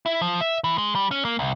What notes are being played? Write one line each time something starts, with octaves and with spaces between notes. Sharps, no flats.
E4
F3
E5
E3
G#3
G3
C#4
A#3
C2